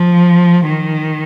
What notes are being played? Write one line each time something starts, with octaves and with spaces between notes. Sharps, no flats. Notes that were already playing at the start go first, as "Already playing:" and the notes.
Already playing: F3
D#3